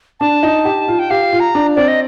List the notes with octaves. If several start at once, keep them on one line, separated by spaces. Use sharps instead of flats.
D4 A5
D#4
G4
F4
G5
G4 F5
F4
A#5
D4
C4 D5
D#5